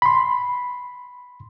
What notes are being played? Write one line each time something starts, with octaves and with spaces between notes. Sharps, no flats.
B5 C6